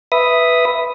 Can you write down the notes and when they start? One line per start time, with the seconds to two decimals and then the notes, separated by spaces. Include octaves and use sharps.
0.12 B4 E5 D#6